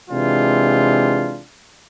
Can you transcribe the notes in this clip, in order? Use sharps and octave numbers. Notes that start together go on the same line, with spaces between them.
C3 E3 G#3 D4 F4 G5